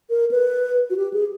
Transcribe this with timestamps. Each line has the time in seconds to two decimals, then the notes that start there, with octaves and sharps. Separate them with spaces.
0.10 A#4
0.31 B4
0.90 F#4
0.97 G4
1.14 G#4